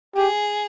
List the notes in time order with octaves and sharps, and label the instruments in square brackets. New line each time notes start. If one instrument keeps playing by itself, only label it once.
[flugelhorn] G4 [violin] G#4